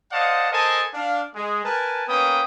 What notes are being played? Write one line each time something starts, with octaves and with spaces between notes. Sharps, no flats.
C5 D5 D#5 F5 F#5 A5
A4 A#4 C5 D#5 G#5 A5
D4 F5
G#3
A#4 B4 G#5 A5
A#3 B3 C#4 B4 G5 D#6